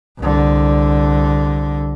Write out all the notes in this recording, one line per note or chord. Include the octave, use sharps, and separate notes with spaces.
C2 D3